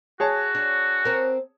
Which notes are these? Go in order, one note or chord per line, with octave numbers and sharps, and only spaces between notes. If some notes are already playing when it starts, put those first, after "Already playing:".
F#4 G#4 C#5 A5
D4
C4 A#4